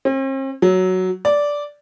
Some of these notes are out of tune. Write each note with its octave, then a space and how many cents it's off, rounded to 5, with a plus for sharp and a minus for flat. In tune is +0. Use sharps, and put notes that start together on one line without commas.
C4 +45
F#3 +5
D5 -10